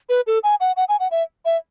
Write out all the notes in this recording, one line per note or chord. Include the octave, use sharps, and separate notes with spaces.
B4
A4
G#5
F#5
F#5
G#5
F#5
E5
E5